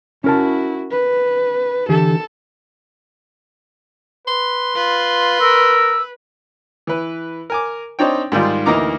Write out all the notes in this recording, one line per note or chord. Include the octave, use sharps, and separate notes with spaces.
C#4 E4 F#4 A#4 A5
B4
D3 E3 G4 A4
B4 C6
F4 B4
A#4 E6
E3 B4
A#4 G#5 D6
C4 D4 D#4 C#5 G5
G#2 D#3 G3 F4
D2 E3 A#3 D#4 A#5 D6